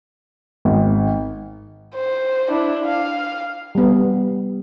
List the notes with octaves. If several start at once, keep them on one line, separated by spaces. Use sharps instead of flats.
G#1
C5
D4 E4
F5
G3 B3